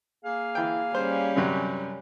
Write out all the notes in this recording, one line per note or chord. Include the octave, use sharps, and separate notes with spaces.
A#3 G#4 F5
E3 G5
G3 C#4 C5
F#2 C3 F#3